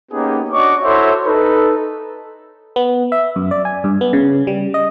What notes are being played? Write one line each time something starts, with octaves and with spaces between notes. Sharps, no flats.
A#3 B3 C#4 D#4 G4 G#4
D4 F#4 C#5 D#5 C#6 D6
E4 F#4 A4 C5 C#5 E5
D#4 A4 B4
B3
E5
F#2
D5
G#5
G2
B3
C#3
G3
D#5